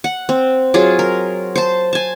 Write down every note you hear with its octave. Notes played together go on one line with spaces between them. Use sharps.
F#5
C4
F#3 F4 G#4
A#4
C5 A5
G#5 A5